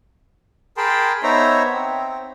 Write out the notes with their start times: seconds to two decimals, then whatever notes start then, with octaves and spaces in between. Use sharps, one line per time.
0.77 G#4 A#4 G5 A5 B5 C6
1.23 B3 D#4 C5 C#5 E5 A#5
1.72 C4